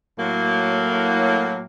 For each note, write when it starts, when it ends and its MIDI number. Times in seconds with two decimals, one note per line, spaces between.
0.19 1.65 45
0.19 1.65 54
0.19 1.65 58